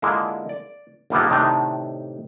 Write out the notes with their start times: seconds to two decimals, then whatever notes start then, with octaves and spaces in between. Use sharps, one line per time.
0.02 D3 G#3 A#3 E4 F4
0.49 D5
1.10 A#1 D#3 G3 A#3 B3 A4
1.30 A2 C3 D#3 D4 D#4